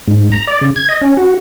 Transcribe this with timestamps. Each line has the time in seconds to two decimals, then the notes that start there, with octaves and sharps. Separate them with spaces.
0.08 G#2
0.32 A#5
0.47 D5
0.61 C#3
0.76 G#6
0.89 D#5
1.01 C#4
1.17 F#4